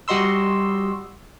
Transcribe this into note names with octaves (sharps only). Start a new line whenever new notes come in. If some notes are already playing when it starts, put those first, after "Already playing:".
G3 F#4 D#5 C6 E6